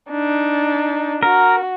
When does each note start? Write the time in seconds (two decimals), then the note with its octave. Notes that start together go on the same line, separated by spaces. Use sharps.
0.10 D4 D#4
1.23 F#4 A#4